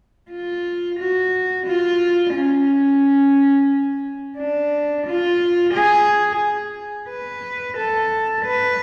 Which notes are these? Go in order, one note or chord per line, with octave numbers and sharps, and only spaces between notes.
F4
F#4
F4
C#4
D4
F4
G#4
B4
A4
B4